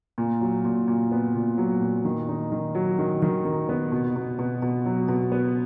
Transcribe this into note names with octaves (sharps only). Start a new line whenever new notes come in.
A#2
F#3
A#2
A#2
B3
A#2
F#3
A#2
D#3
D#4
D#3
F#3
D#3
D#3
D#3
B3
B2
B2
B2
B2
F#3
B2
B3